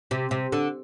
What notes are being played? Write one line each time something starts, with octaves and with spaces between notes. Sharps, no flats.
C3
C3
D3